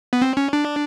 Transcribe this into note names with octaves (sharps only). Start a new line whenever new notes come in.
B3
C4
C#4
D4